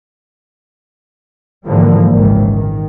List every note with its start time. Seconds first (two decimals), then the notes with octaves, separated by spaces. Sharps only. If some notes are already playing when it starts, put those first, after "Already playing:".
1.65 G#2 D3 E3 F3 G3 A#3
2.12 G#1 C#2 A#2 D#3 E3
2.54 D#3